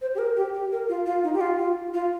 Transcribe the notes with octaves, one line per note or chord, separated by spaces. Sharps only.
C5
G4
A#4
G4
G4
A#4
F4
F4
D#4
G4
F4
F4
F4